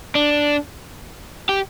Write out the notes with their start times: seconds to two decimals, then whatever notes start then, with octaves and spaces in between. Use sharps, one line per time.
0.15 D4
1.49 G4